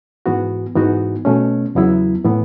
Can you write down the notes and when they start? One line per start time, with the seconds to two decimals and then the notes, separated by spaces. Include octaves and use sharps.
0.26 G#2 E3 B3 F#4
0.75 G#2 E3 B3 D#4 F#4
1.25 B2 A3 C#4
1.75 E2 C#3 F#3 B3 E4
2.24 A2 E3 B3